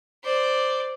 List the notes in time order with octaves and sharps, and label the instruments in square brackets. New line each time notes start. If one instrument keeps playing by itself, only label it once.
[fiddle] C5 D5